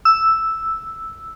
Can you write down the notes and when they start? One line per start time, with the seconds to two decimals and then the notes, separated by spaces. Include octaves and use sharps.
0.05 E6